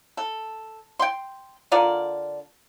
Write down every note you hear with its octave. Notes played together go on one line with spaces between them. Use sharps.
A4
G5 C6
D3 F4 A#4 D5